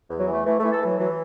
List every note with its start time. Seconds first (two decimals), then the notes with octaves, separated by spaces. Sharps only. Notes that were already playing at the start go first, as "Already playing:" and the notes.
0.09 E2
0.19 F#3
0.28 E3 A3
0.45 E3 A3
0.59 A3
0.63 E3
0.72 A4
0.81 E3 F#3
0.98 E3 F#3